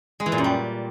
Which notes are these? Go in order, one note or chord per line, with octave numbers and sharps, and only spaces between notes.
G#3
E3
A#2
F#2
G3